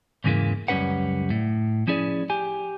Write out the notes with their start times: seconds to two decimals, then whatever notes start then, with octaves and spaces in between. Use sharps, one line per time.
0.24 E2 G#2 C#3 E3 G#3 A#3
0.68 C#2 F#2 G3 C#4 B4 F#5
1.30 A2
1.87 F3 C#4 E4 G#4 D5
2.30 G4 G#5